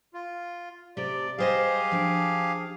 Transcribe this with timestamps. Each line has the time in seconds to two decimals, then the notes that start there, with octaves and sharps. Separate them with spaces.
0.14 F4
0.97 C3 A3 G4 D5
1.38 G3 G4 G#4 C5 D#5 F5
1.92 F3 D4